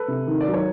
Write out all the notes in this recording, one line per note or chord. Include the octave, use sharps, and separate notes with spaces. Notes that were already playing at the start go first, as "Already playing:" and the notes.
Already playing: A4 B4
C3
D#3
D5
F#3
C#5